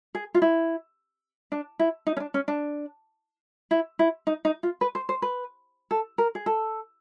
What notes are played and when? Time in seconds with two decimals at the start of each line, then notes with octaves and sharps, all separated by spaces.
0.15 G#4
0.34 F4
0.42 E4
1.52 D4
1.79 E4
2.07 D#4
2.17 C#4
2.20 D4
2.34 C#4
2.48 D4
3.71 E4
3.99 E4
4.27 D#4
4.45 D#4
4.63 F4
4.81 B4
4.95 C5
5.09 C5
5.22 B4
5.91 A4
6.18 A#4
6.35 G#4
6.46 A4